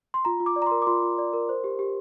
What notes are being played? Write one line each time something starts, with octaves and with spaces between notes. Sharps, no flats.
C6
F4 A#5
F4
D6
D5
A#5
A#4 C6
D6
F4 C6
F4
D5
A#4
C5
G4
G4